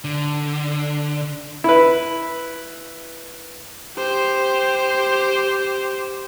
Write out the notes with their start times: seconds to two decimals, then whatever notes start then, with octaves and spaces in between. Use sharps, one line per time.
0.04 D3
1.64 E4 B4
3.97 G4 C5